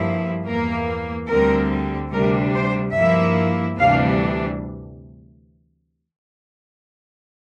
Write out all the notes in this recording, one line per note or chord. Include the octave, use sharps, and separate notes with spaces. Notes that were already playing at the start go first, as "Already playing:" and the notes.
Already playing: G2 F3 A#3 E4
E2 E3 A#3 A#4
D2 D3 G3 C4 A#4
D2 C3 G3 D4 A#4
C5
G2 F3 A#3 E4 E5
D2 C3 E3 G3 D4 F5